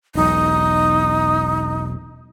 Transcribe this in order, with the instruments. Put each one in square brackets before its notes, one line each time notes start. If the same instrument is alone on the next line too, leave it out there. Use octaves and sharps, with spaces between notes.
[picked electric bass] E1 B1 [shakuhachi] D#4